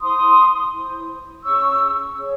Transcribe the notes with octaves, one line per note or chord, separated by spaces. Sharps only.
E4 C5 C6 D#6
E4 C5
C#4 G#4 C#5 C#6 E6
C#4 G#4 C#5